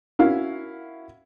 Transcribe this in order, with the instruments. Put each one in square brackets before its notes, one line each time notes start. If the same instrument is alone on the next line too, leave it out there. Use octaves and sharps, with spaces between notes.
[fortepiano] C#4 E4 F#4 A#4 E5 F5